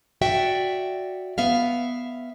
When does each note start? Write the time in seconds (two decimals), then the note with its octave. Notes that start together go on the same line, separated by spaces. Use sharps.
0.21 F#4 D5 E5 G5
1.38 B3 E5 F5